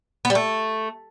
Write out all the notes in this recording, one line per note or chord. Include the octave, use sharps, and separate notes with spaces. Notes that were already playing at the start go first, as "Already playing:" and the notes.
B3
G3
A3